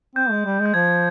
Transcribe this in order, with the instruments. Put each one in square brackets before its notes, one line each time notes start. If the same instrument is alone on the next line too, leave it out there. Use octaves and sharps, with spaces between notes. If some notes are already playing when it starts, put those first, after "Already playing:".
[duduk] C4 [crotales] G6
[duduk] G#3
G3
G#3
[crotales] G6
[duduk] F3 [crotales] G#6